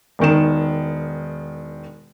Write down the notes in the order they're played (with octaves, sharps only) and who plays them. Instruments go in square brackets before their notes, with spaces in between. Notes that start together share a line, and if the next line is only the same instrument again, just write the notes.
[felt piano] E1 D#3 E7